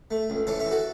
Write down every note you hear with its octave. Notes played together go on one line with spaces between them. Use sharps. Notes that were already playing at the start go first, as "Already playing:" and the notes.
A3
C#2
E3 A4 C#5
C#5 E5
E3
F#4 A4